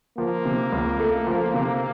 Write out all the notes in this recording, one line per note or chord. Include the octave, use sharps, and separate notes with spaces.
F3 A#3
C3
C#2
A3
F3
C3